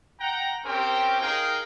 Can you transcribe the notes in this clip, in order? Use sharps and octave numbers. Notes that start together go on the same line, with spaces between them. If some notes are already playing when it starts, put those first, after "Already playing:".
F#5 G5 A#5
C4 C#4 G4 A#4 C5 G5
D#4 G#4 A#4 F5 G5 G#5